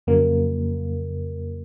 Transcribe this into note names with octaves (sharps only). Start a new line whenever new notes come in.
F2 C#3 F#3 A#3